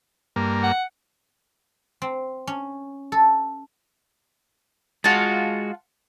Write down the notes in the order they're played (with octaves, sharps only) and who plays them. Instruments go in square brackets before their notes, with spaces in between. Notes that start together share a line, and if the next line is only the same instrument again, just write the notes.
[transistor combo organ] G2 A#3
[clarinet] F#5
[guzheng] C4
C#4
A4
[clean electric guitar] G#3 F#4 [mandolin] F4 F#5 A5